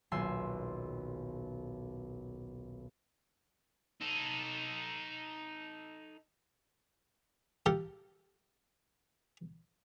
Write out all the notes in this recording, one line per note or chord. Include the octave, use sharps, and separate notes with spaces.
D#1 B1 G#5 C6 E6
D#4 A4
F4 G4 A4 A#4